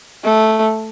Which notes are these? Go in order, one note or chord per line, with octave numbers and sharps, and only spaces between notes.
A3